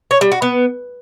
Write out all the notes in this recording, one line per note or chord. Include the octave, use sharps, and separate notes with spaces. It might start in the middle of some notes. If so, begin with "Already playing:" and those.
C#5
G3
F#4
B3